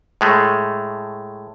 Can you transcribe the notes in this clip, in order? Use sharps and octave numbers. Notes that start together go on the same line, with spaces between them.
A2 G#3 A3